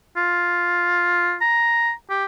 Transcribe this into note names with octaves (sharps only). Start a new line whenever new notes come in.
F4
A#5
G4